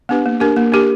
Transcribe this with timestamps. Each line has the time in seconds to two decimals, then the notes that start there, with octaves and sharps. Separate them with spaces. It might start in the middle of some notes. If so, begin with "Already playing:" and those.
0.09 B3 D4 G4 B4
0.26 A#3
0.40 D4 G4 A#4
0.56 A#3
0.72 D4 G4 A#4